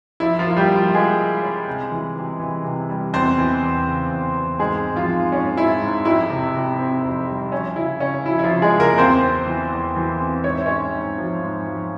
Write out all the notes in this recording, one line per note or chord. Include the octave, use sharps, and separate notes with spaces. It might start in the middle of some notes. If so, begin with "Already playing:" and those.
F3 E4
F3 F4
A#3
F4
G3 G4
A#3
F3 F4
G#3 A#3 G#4
F3
C#4
C3
E3
C3
E3
C3
G3
E2 C4 C5
E3
E2
C#3
E2
E2
G#2 G#3 G#4
G#2
F3 F4
G#2
G#2 C#4
G#2 E4
G#2
F2 E4
C3
C3
C4
F2
G3
F3 C#4
C#3 E4
C#3 C#4
F3 E4
E4
F3 F4
C#3
G#3 G#4
C#3
A#3 A#4
E2 C4 C5
C4
E3
E2
E3
C4
G#2 C#5
E5
G#3 C#4 C#5
G#2
F3
G#2
F3